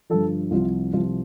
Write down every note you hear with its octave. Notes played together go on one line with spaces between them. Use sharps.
G2 D3 F3 A4
C2 C3 F3 F4
C2 C3 F3 F4